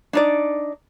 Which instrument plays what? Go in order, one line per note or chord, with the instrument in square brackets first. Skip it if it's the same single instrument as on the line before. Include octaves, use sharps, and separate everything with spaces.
[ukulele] D4 D#4 D5